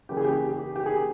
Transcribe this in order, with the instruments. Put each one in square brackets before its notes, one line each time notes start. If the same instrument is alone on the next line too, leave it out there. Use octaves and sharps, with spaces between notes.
[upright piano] C#3 E3 A#3 C#4 G4
G#4
G4
G4
G4
G#4